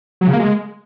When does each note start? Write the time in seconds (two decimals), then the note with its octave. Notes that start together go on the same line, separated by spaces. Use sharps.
0.21 F#3
0.27 C#3
0.33 A#3
0.40 G#3